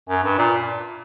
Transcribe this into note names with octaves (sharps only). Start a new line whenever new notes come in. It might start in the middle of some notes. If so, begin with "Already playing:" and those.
F#2
G2
A#2